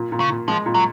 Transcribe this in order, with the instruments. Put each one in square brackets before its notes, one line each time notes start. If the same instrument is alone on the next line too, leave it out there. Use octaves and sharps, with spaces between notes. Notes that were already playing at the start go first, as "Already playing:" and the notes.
Already playing: [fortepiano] A#2
A#2
[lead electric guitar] C#3
[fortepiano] A#2
[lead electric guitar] F3 [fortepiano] G#3
[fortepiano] A#2
[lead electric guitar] F#3